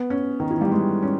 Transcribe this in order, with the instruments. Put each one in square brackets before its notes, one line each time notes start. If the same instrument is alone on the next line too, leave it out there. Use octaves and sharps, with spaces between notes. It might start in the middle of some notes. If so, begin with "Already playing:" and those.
Already playing: [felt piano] B3
C#4
D#3
E3
G3
G#3
C#4